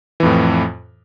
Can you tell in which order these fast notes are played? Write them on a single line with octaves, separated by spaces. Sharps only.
E3 F2 A2